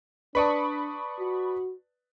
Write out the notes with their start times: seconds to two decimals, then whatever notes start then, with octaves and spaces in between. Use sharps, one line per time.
0.35 D4 B4 D5 A5 B5 C#6 D#6
1.19 F#4